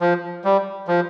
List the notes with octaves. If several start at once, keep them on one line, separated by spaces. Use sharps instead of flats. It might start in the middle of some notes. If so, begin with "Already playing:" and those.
F3
G3
F3